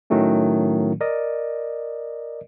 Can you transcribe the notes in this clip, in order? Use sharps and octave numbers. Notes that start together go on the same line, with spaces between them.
A2 D#3 F#3 A3 C#4
A#4 D5 D#5